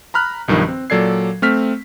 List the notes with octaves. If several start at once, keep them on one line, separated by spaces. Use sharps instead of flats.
A#5 B5 F6 F#6
B1 G2 D#3 F3
C4
A#2 F#3 A4 D5 G#6 C7
A3 C4 F6 B6